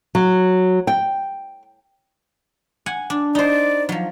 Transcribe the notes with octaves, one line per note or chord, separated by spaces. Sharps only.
F#3
G5
F#5 G#5
D4
D#4 C5 D5
F3 F#3